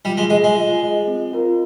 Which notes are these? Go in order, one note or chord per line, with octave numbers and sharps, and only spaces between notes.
G3 F4
G#3
G#3 G#4 D#5
G#3
F4
G#4 D#5
C4
F4 A#4